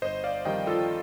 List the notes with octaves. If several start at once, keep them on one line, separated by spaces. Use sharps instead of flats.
G1 C5 D#5
D5 F5
F2 D#3 G3 D#5 G5
F4 A4